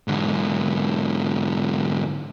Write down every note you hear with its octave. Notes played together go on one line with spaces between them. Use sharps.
G#2 D3